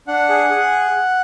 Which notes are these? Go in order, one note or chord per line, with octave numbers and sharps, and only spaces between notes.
D4 F#5
G#4
G#4